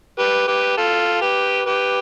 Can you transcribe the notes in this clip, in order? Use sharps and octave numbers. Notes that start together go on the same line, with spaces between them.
G4 B4
G4 B4
F4 A4
G4 B4
G4 B4